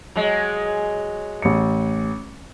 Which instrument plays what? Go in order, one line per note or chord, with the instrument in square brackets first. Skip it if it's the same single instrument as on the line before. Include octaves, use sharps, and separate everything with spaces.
[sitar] F#3 G#3
[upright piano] A1 C#7